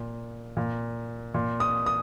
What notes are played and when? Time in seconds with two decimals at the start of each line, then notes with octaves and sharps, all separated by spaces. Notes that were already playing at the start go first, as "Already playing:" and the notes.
Already playing: A#2
0.57 A#2
1.34 A#2
1.60 D#6
1.86 D#6